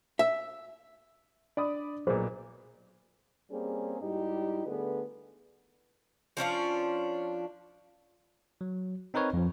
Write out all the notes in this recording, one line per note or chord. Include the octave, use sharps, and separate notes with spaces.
E5
D4 D5 B5 D#6
B1 A#2 F#3 G#4 C5 D5
G3 A#3 C4 C#4 G#4
G#2 G3 D#4 E4 F#4 G4
D3 A3 B3 G#4 A4 B4
F3 C#4 D4 F4
F#3
C4 D#4 A#4 B4 C#5
F2 F3